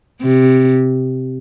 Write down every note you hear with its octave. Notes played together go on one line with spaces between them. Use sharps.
C3